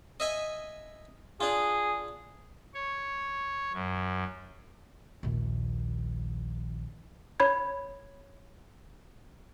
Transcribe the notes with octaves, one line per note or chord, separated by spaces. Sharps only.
D#5 E5 G#5
D4 F4 G#4
C#5
F#2
A#1 D#2
C#5 B5 G#6